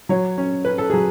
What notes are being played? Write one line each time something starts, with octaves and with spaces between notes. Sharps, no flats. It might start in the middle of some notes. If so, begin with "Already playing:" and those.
F#3 C#5
C#4
C#4 B4
A4
F#3 G#4